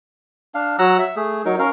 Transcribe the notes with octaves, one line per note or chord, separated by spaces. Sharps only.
D4 F5
F#3 F#5 A#5 E6
E5
A3 G#4
F#3 D#4 A#4
C#4 A#4 F5